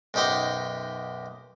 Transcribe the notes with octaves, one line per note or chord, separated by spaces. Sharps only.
B1 F#2 D#4 G4 C5 C6